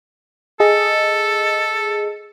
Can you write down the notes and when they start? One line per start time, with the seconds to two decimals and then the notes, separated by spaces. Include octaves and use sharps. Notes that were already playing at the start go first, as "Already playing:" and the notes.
0.60 G#4 A4 D#5